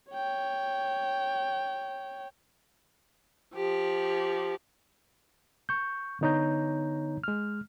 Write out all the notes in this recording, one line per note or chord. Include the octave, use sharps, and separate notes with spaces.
C#5 G5
F3 G4
C#6 G6
D3 B3 D#4 C#5 A#5 G6
G#3 F6